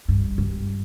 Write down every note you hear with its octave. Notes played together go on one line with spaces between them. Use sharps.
G2
G2